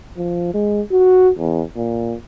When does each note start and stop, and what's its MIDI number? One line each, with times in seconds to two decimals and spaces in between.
0.17 0.54 53
0.54 0.81 56
0.92 1.30 66
1.38 1.62 40
1.77 2.15 46